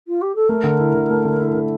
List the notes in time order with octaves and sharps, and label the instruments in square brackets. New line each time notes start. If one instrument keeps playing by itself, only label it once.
[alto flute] F4
G4
A4
[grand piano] A3 [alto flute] A#4
[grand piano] D3
E4
D3
A3
D3
E4
D3